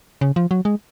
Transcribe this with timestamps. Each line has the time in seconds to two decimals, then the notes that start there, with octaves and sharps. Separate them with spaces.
0.21 C#3
0.36 F3
0.51 F#3
0.65 G#3